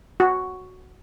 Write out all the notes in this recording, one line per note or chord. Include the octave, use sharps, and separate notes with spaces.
F#4